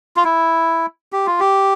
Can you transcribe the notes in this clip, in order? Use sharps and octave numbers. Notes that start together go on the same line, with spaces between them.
F4
E4
G4
F4
G4